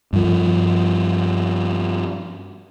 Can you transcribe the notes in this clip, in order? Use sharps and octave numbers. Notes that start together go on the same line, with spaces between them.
G2 F3